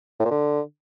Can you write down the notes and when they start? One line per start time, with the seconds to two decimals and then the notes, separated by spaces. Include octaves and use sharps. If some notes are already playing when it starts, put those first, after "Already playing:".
0.20 A2
0.25 A#2
0.31 D3